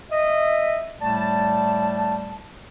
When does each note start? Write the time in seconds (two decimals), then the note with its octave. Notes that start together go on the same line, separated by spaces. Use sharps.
0.11 D#5 E5
1.00 A2 G3 A3 D5 A5